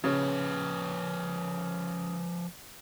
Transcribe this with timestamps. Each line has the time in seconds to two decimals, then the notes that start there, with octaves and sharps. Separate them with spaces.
0.04 C#3 F3 B4 C#5